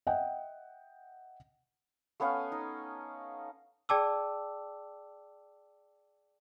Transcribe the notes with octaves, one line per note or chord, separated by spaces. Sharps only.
D#5 E5 F#5 G5
A3 B3 C#4 F5
D#4
G#4 D5 G5 A5 D6 E6